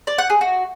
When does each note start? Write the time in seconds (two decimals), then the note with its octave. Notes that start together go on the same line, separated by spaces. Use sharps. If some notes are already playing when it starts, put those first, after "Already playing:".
0.07 D5
0.18 F#5
0.30 G#4
0.41 F#4